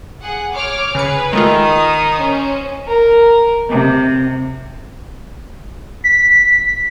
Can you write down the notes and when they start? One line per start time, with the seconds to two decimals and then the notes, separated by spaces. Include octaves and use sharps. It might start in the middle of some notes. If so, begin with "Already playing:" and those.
0.21 G#4 F#5
0.52 C#5 D6 F6
0.95 C#3 G#4 B4 C#7
1.33 D#3 G#3 A3 F4
1.62 D#6
2.15 C#4 C5
2.87 A#4
3.68 C3
6.04 B6